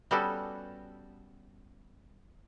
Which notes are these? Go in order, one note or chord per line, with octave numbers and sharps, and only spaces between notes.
G3 B3 C#4 F#4 G4 A4